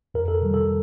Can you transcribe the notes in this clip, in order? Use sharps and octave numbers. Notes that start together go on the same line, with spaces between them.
F2 A#4
A4
C3 D#3 G3
A4